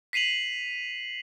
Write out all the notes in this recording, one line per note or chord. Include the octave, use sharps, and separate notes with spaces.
B6 C7 D#7 F7 F#7